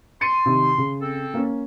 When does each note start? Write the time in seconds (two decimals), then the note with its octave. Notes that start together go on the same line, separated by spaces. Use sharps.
0.21 C6 A6 C#7 D#7
0.46 C3 D#3
0.78 C#3
1.00 C4 A4
1.34 A#3 C#4